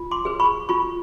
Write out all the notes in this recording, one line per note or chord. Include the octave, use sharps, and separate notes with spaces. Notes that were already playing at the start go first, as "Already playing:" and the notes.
Already playing: F4
C6 D6
G#4 B4
B5 C#6
F4 B5 C#6